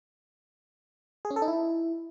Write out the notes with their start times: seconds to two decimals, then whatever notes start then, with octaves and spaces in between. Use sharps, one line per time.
1.25 G#4
1.30 C#4
1.36 A4
1.42 D#4
1.48 E4